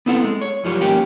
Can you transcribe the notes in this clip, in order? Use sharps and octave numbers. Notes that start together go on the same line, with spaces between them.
B3 C4 E4 A4 F#5
G#3
C#5
F#2 F3 G3 G#4 C#5
D#2 G#2 A#3 C#4 G4 C#5